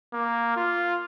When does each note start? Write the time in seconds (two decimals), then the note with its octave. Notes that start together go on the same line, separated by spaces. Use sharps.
0.13 A#3
0.56 F4